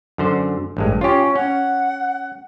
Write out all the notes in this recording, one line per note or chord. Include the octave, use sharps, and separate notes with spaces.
F#2 D3 C5
A1 G2 G#3
C#4 F4 G4
C#4 F#5